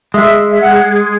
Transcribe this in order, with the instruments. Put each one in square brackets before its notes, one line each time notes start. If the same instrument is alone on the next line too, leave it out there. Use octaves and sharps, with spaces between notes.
[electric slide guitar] G#3 [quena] E5
[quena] E5
F#5